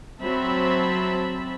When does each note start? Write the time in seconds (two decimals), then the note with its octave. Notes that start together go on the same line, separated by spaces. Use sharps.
0.21 F#3 C4 E5 A5 B5